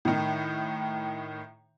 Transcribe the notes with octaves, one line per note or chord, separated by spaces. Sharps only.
A2 D#3